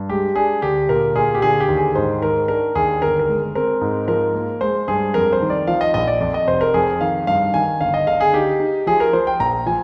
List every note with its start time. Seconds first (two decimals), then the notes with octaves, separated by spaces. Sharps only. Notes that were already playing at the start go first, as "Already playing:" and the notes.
Already playing: G2
0.09 G#3 G4
0.35 D4 G#4
0.62 D2 G4
0.89 A#2 A#4
1.15 A#2 G#4
1.35 G4
1.42 D3 G#4
1.60 G4
1.68 D#2
1.77 G#4
1.95 G#2 C5
2.22 D#3 A#4
2.48 D4 A#4
2.75 D#2 G#4
3.02 G1 A#4
3.19 A#4
3.28 G#3
3.55 C4 A#4
3.81 G#2
4.08 F3 A#4
4.35 A#3
4.61 G#3 C5
4.88 G2 G#4
5.14 F2 A#4
5.33 C5
5.41 D#3
5.50 D5
5.67 F3 F5
5.81 D#5
5.94 A#1 D#5
6.07 D5
6.20 F2 D5
6.34 D#5
6.47 F1 C5
6.61 A#4
6.74 F2 G#4
7.00 D#3 F5
7.27 G2 F5
7.54 D#3 G#5
7.80 G1 F5
7.94 D#5
8.07 D3 F5
8.20 G#4
8.33 D#4 G4
8.60 D#4
8.87 F3 G#4
9.00 A#4
9.13 F3 C5
9.27 G5
9.40 A#1 A#5
9.66 F3 G#5